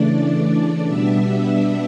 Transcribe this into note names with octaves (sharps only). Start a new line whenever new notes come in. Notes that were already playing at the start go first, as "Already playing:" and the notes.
Already playing: C#3 E3 A3 D4 D5
B2 G3 B3 D4 E5